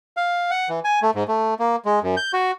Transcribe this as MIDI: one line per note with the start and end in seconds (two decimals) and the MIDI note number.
0.17 0.51 77
0.51 0.69 78
0.69 0.80 52
0.85 0.99 80
1.02 1.11 57
1.15 1.24 44
1.28 1.54 57
1.59 1.76 58
1.85 1.99 56
2.03 2.15 42
2.17 2.32 91
2.33 2.51 66